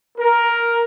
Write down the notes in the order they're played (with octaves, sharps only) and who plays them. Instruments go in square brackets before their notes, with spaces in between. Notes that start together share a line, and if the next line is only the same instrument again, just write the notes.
[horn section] A#4